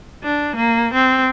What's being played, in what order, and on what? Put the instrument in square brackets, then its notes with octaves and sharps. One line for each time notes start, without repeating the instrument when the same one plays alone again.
[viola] D4
A#3
C4